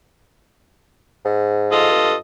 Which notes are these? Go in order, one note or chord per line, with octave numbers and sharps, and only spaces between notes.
G#2
F4 A4 D#5
G2